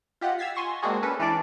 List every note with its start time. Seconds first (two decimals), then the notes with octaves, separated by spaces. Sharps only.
0.21 F4 G4 D#5 F#5
0.38 E6 F6 G#6 A6 B6 C7
0.55 G#5 C6 C#6 A#6 E7
0.83 G#3 A#3 C4 D4 F#4 G#4
1.03 C#4 A4 B4
1.20 E3 C#4 D4 D5 D6